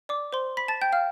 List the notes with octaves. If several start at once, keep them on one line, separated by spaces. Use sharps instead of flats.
D5 D6
C5 C6
B5 B6
A5 A6
G5 G6
F5 F6